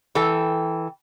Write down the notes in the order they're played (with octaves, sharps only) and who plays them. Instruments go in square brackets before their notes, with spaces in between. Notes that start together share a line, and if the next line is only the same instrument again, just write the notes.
[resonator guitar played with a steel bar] E3 A4 G5